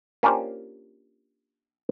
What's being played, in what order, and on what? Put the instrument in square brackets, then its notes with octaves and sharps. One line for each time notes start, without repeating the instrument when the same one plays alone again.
[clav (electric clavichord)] A#3 C#4 D4 F4 G4 C5